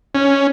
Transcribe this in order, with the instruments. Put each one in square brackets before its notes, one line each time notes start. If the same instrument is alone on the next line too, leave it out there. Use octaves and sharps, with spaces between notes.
[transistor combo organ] C#4